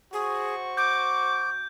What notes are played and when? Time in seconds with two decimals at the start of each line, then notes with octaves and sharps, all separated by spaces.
0.13 F#4 G#4 C5 C#6
0.77 D6 G6